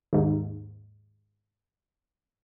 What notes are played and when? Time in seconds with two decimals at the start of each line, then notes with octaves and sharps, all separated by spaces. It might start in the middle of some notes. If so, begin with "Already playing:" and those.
0.13 D#2 G#2